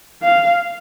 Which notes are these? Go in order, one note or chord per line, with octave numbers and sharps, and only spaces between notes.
F5